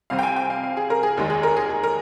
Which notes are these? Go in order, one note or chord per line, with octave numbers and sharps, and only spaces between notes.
C2 C3 G3 C4 F5
G5
G#5
G5
F5
F5
G#4
A#4
G#4
F1 D#2 D#3 G#3
G#4
A#4
G#4
G#4
A#4